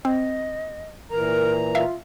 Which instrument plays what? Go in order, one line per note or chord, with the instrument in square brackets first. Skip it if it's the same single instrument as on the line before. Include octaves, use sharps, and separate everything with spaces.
[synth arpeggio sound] C4 [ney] D#5
[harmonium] A#2 E3 A#5 [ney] A#4
[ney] F4 [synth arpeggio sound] E5 F5